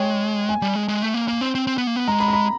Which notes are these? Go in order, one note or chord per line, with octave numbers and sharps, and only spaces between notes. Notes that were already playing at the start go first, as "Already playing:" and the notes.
Already playing: G#3 C#5 G5
G#5
G3
G#3
G#3
A3
A#3
A#3
C4
C4
C4
B3
A#3
B3
G#3 A#5
B5
A#5
B5